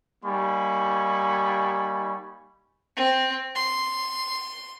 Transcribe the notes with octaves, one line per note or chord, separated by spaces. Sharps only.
G3 A#3 D#4 G#5 B5 C#6
C4
C6